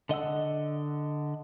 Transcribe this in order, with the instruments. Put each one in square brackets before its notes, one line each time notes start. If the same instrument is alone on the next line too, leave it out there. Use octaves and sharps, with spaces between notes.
[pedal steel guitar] D3 D#5 F#5 E6